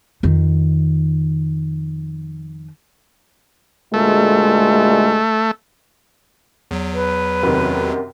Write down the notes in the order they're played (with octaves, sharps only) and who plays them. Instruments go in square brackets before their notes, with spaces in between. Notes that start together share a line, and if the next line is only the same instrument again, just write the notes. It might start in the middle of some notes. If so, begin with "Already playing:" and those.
[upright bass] F2 D#3
[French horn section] D2 A#2 G#3 [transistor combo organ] A3
[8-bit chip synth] E2 F#3
[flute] B4
[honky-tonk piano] F#2 C3 D#3